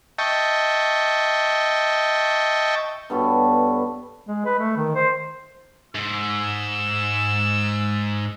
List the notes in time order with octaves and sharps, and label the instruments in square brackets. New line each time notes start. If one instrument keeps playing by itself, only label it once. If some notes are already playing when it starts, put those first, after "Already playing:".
[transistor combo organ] D#5 E5 G5 A5 C#6
[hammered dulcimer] G2 B3 A4 C#5
[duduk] G#3
B4
A3
D#3
C5
[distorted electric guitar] G#2 [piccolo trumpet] E6